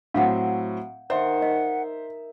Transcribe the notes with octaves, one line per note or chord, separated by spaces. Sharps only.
A2 F#3 C4 F5 F#5
D#3 C5 E5 F#5
D#5 E5